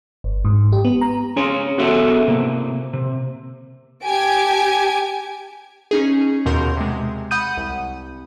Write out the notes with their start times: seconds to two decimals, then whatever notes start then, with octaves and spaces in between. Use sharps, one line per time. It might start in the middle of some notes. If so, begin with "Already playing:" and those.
0.24 G1
0.45 G#2
0.72 G4
0.85 B3
1.01 A#5
1.36 C#4 G#4 C#5 C6
1.78 B3 C#4 F#4 G#4 A4 E5
2.28 C3 A#3
2.93 C3
4.05 G4 G#5 A5 G#6 D7
5.91 C#4 D#4 G#4
6.46 D#2 B2 F#4 A#4 C6 G6
6.77 C3 G#3
7.31 F#5 B5 D#6 G6 D#7
7.57 C2